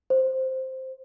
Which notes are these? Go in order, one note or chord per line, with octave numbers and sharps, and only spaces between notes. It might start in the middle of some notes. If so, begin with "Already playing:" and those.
C5